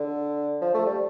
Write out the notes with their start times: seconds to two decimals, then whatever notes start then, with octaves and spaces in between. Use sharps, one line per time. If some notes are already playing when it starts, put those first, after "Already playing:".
Already playing: D3
0.61 F3
0.74 A3
0.86 G3